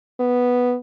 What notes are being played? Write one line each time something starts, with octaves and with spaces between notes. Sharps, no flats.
B3